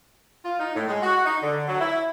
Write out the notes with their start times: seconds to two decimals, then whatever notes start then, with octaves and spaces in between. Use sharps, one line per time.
0.45 F4
0.60 D#4
0.75 A2
0.88 G#3
1.02 F#4
1.25 D#4
1.42 D3
1.68 F#3
1.80 E4